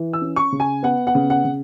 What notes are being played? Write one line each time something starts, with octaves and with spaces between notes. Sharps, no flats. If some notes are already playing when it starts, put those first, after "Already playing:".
Already playing: E3
E6
C#4
C#6
C#3
G#5
B3 F#5
F#5
C#3
F#5
C#3